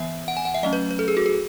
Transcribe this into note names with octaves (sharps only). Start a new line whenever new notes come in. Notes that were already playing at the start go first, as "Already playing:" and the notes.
Already playing: E3 B3 E5
F#5
G#5
F#5
E5
F#3 A3 C#4 D#5
B4
B4
A4
G#4
F#4
G#4